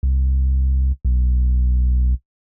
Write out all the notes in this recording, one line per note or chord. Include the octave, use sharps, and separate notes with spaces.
C2
B1